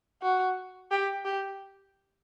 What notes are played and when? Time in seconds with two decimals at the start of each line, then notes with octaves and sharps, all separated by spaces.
0.22 F#4
0.91 G4
1.25 G4